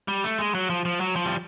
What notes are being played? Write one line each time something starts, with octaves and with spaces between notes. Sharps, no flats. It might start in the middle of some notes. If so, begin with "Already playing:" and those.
G3
A3
G#3
F#3
F3
F3
F#3
F3
G3